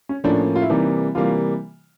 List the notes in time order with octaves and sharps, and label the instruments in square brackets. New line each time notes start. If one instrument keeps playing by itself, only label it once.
[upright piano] C#4
[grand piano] A2 F3 A#3 C#4 [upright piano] D4
[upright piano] F4
E4
[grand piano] C3 E3 G3 A#3 [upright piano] D#4
[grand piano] C3 E3 G3 A#3 [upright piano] F4